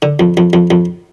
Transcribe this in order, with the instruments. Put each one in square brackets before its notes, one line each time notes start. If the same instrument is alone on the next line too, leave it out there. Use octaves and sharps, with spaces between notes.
[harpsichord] D3
F2
F2
F2
F2